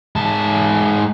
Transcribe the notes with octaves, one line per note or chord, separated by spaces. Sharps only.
G#2 A5